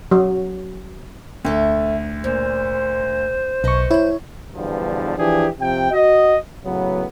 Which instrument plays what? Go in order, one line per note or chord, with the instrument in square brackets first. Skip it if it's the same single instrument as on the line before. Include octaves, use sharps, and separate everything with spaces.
[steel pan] F#3
[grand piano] D2 [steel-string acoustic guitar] A2 A4 E5
[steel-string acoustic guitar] A#2 [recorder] C5
[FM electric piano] B1 C#6 [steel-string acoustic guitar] B4 D#5
[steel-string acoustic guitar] E2 G#2 [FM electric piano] E4 C#5
[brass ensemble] E2 G2 B2 D3 F3
E3 F3 D4 G4 G#4
C3 F3 G5
F#4 D#5
A2 C#3 F#3 B3